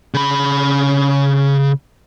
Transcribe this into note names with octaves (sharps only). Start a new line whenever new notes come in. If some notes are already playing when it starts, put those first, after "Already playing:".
C#3 B5